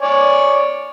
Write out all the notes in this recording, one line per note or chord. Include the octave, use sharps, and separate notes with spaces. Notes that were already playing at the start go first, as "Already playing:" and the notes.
C#5 D5 G#5